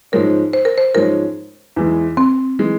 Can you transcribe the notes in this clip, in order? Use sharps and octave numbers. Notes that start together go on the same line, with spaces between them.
G#2 F3 G#3 C#4 A#4
C5
A#4
C5
G#2 F3 G#3 C#4 A#4
E2 E3 G#3
C4
E3 G#3